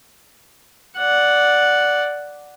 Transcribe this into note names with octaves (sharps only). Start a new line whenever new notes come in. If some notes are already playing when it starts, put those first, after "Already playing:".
D5 F#5